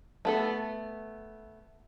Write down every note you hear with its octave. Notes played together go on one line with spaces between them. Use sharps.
A3 B3 A4